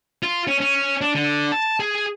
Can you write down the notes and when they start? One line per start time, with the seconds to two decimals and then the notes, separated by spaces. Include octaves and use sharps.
0.23 F4
0.47 C#4
0.60 C#4
1.01 D4
1.15 D3
1.52 A5
1.80 G#4